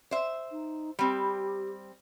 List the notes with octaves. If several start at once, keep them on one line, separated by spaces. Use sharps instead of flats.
C5 E5
D#4
G3 C4 G4